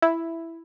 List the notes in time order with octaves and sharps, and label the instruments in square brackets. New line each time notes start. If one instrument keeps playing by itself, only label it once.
[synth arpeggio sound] E4